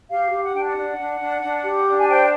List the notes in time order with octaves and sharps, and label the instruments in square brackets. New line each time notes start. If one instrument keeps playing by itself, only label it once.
[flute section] G4 F5
G4
F#5
D4 G5
F#5
D4
D4
D4
D4
G4
D4
G#5
C5 G5